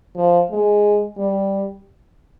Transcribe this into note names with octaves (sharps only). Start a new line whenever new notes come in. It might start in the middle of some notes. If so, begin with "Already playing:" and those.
F3
G#3
G3